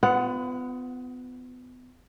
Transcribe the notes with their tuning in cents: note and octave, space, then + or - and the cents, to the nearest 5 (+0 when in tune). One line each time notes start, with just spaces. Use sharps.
B3 +30 F4 +0 F#5 +0